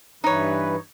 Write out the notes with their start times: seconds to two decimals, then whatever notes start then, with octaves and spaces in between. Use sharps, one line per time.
0.24 G2 E3 D#4 B4 C#5